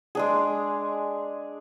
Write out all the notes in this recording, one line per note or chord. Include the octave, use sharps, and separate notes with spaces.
G#3 D4 G#4